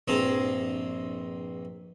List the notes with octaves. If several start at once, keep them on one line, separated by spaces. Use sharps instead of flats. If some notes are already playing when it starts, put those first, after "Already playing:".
A#1 G2 C4 G#4 A5 A#5